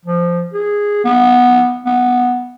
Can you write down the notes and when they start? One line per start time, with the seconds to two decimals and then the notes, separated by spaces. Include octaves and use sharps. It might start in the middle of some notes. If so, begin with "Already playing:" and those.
0.06 F3
0.53 G#4
1.04 B3
1.86 B3